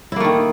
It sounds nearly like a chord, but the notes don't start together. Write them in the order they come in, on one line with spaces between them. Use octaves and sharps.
E4 A#3 A3 D#3